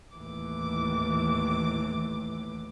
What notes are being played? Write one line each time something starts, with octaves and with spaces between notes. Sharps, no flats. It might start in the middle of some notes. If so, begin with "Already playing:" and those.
D#2 A2 E3 D6